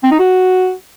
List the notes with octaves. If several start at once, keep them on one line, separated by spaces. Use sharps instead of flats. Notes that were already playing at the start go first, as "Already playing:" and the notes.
C4
D#4
F#4